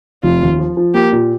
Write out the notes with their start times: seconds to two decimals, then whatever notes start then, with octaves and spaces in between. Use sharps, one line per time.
0.23 F1 F4
0.41 D#2
0.59 F3
0.77 F3
0.94 A#3 G4
1.12 A#2